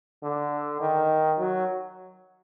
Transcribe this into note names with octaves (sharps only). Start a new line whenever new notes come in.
D3
D#3
F#3